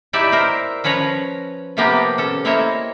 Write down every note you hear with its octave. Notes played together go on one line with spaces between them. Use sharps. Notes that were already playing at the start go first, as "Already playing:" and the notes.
D#4 E4 G4 B4 D5 E5
A#4 C5 E5
F3 C#4 B4 C#5 A#5
C3 F3 A#3 B3 G4 A#5
C#4 A4
A#3 C4 E4 C#5 D#5 E5